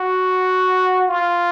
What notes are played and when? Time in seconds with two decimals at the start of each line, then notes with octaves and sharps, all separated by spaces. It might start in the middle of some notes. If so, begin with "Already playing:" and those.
Already playing: F#4
1.08 F4